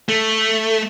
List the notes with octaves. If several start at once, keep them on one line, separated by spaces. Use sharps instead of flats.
A3